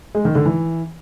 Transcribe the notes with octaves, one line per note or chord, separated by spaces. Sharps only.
G#3
D#3
D3
E3